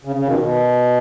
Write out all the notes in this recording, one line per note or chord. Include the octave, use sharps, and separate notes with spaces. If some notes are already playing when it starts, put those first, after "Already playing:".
C#3
C#3
B2 D#3
B2